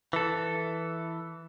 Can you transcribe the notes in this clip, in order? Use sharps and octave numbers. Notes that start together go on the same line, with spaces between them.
E3 A4